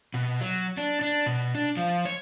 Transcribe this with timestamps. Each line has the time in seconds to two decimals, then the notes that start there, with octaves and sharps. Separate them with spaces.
0.14 B2
0.41 F#3
0.78 D4
1.02 D4
1.26 B2
1.55 D4
1.77 F3
2.05 C#5